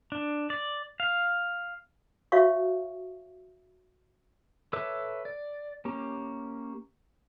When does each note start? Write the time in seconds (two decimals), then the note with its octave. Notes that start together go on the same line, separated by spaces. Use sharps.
0.12 D4
0.50 D5
1.00 F5
2.32 F#4 C#5 E5 F5 C#6
4.73 A4 B4 C#5 E5 D6
5.25 D5
5.85 A#3 C#4 G4